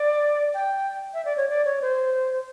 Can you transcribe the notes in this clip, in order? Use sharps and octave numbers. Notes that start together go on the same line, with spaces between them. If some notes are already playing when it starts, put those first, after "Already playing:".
Already playing: D5
G5
E5
D5
C#5
D5
C#5
C5